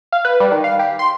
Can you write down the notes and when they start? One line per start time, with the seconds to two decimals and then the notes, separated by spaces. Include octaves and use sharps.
0.12 F5
0.25 B4
0.40 G3
0.52 D#3
0.64 F5
0.79 G4
0.99 C6